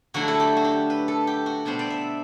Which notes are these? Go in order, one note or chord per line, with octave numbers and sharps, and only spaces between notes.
D3 F#3 A3 E4 F#4
A4
G4
F#4
G4
B4
A4
G4
F#4
B2 G3 B3 D4 C5
D5
E5